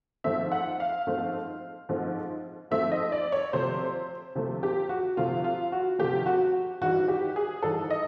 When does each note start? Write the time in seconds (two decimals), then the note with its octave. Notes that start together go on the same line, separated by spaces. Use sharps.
0.24 G#2 F3 A3 C4 E5
0.52 F#5
0.80 F5
1.07 G#2 F3 A3 C4
1.89 G#2 F3 A3 C4
2.71 G#2 F3 A3 C4 E5
2.92 D#5
3.12 D5
3.32 C#5
3.53 C3 F3 A3 C5
4.35 C3 F3 A3
4.63 G4
4.89 F#4
5.17 C3 F3 A3 F4
5.44 F4
5.72 F#4
5.99 C3 F3 A3 G4
6.26 F#4
6.81 G#2 E3 G3 F#4
7.08 G4
7.36 G#4
7.62 G#2 E3 G3 A4
7.90 D#5